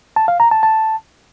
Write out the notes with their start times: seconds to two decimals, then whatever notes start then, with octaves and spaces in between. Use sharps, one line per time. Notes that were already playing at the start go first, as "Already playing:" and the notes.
0.16 A5
0.28 F5
0.40 A#5
0.51 A5
0.63 A5